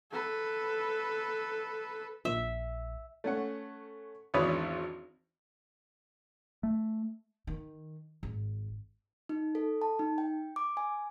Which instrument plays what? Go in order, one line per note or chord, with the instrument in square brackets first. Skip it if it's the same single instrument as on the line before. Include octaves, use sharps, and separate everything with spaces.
[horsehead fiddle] A4 B4
[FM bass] A#1 [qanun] E5
[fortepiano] A3 C#4 F#5
G#1 E2 D4 B4 C#5 D#6
[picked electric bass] A3
[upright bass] D#3
G#1
[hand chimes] D#4
A4
A5
D#4
G5
D6
G#5